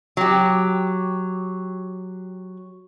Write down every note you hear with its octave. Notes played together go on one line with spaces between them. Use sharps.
F#3 G4